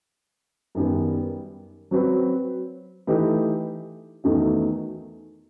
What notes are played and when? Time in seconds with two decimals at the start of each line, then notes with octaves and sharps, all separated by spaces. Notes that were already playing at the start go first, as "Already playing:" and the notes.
0.75 F#2 D#3 G3 B3
1.91 F#3 C4 F#4 B4
3.07 E3 A3 D#4 G4 B4
4.24 E2 D#3 A3 D#4 F#4